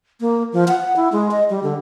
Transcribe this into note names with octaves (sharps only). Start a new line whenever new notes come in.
A#3
F3
F#5
E4
G#3
D#5
G3
D3